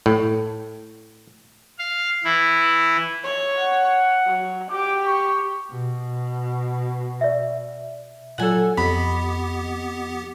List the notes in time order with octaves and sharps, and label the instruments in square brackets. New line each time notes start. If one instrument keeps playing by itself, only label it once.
[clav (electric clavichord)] A2
[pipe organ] F5
E3 E4
[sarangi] C#5
[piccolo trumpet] F#5
[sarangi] F#3
[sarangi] G4 [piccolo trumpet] D6
[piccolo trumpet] C#6
[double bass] B2
[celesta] D5 E5
[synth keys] A#2 F#3 A4 [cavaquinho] F#5 G#5
[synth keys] F2 D#5 [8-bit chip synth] B3 G4 [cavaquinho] B5